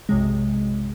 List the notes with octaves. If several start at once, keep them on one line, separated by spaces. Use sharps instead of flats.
B1 F#2 C3 G#3